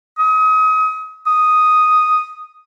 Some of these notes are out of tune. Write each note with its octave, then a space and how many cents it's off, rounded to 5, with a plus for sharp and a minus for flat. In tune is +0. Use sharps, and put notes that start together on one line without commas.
D#6 +30
D#6 +0